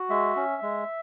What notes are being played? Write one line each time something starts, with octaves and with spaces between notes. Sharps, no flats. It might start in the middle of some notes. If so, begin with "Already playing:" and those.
Already playing: F#4
G#3 E5
C#4
G#3